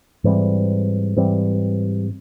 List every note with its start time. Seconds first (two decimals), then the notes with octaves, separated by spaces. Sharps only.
0.24 G#2 E3 G3 C4
1.16 G#2 E3 G3 C4